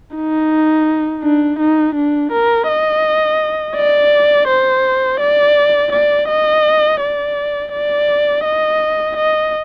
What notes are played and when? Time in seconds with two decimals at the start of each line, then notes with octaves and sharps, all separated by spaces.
0.16 D#4
1.23 D4
1.59 D#4
1.95 D4
2.32 A#4
2.68 D#5
3.76 D5
4.48 C5
5.20 D5
5.92 D5
6.28 D#5
7.01 D5
7.73 D5
8.45 D#5
9.17 D#5